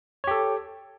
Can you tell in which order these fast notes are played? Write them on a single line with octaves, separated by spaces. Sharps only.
C#5 G4 A4